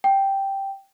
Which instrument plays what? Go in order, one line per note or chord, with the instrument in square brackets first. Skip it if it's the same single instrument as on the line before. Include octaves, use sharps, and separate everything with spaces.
[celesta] G5